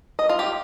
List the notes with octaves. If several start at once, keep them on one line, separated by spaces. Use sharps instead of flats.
D#5
F4
G4